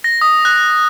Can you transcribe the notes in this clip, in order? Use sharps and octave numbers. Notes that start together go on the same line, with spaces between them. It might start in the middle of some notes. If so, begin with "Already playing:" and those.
A#6
D#6
F#6